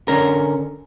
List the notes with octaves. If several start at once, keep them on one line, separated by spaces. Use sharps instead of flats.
D3 C#4 A#4